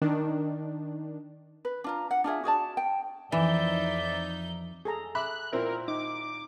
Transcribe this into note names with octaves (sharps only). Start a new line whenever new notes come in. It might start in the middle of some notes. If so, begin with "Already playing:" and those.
D#3 D4
B4
D4 F4 A#5
F#5
D4 F4 G#4 E5
F#4 G#4 D5 A5
G5
F2 E3 D#4 D5 E5 G6
G#4 A4 A#5
E5 B5 D6 F#6
A#2 C4 E4 A#4
D#4 D6